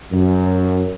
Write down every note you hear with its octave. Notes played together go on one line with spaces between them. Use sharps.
F#2